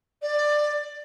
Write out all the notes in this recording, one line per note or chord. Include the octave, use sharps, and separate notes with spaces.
D5